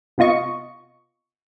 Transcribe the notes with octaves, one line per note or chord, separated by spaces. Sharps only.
C3 B3 F4 D#5 C#6